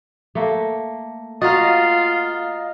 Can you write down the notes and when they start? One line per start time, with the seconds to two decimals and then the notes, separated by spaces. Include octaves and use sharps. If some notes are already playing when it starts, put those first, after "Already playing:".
0.35 A3 A#3
1.41 F4 F#4 D#5 F5 A#5 A6